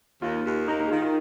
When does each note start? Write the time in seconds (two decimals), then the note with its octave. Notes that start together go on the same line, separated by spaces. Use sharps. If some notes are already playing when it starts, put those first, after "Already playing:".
0.22 D#2 F4
0.46 D#2
0.68 A#3 D#4
0.80 D#4
0.86 G#4
0.91 D#3 F4
1.02 F4